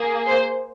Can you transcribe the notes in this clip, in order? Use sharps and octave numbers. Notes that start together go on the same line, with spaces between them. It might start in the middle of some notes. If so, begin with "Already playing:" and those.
Already playing: A#3 G#4
C5